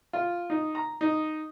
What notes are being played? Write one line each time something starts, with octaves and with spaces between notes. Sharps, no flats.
F4
D#4
A#5
D#4